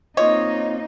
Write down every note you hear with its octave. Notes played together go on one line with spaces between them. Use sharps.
A#3 C4 D#4 F4 C5 C#5 D#5